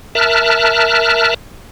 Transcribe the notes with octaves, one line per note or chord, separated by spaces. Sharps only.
A#4 E5 A5 F6 F#6